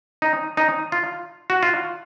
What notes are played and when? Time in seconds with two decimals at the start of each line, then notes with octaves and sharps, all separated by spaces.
0.22 D#4
0.57 D#4
0.92 F4
1.50 F#4
1.63 F4